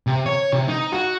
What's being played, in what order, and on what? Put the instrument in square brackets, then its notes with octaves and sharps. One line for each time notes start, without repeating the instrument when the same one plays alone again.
[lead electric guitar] C3
C#5
C3
D#4
F#4